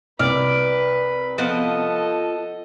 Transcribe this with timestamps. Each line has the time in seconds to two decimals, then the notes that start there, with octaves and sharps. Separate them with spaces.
0.19 C2 B4 D5 B5 F6
1.38 F3 B3 A4 D#5